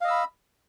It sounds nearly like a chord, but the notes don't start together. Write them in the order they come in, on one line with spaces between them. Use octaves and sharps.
F5 D#5 E6 B5